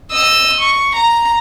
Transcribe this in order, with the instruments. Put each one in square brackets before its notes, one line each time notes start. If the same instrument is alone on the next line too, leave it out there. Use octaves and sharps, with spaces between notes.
[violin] D#5 E6
C#6
A#5